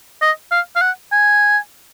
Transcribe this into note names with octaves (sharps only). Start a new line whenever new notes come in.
D#5
F5
F5
F#5
G#5